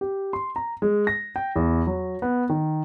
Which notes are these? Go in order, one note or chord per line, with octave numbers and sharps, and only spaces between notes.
G4
C6
A#5
G#3
A#6
G5
E2
F#3
B3
D#3